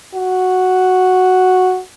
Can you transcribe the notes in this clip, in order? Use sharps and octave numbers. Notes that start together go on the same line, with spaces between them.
F#4